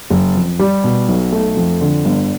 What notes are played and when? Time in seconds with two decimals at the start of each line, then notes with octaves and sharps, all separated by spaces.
0.10 F#1
0.35 F2
0.59 G3
0.84 B2
1.08 B1
1.32 A3
1.57 F2
1.81 D3
2.05 G1